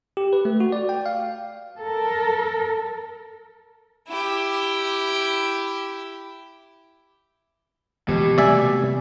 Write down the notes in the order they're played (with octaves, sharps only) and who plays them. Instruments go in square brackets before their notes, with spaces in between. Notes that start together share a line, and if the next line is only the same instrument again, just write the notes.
[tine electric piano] G4
B4
A3
F#4
D5
G5
F5
[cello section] A4 A#4
[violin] E4 G4
[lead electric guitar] B2 [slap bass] E3 F3 G#3 [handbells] G4
[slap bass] C3 G3 A3 [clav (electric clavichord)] D5 E5 G#5